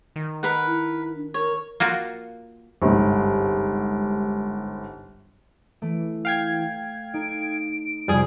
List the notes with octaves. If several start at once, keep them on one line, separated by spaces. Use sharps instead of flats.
D#3
A#4 B4 F#5
E4
D4
A#4 C#5
A#3 F4 F#4
G1 C2 G#2
E3 A3 D7
F5 G5 G#6
D#4 A4 D7
F2 C3 G3 G#4